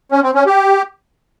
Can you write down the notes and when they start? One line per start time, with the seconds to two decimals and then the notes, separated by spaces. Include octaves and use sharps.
0.12 C#4
0.23 C4
0.35 C#4
0.46 G4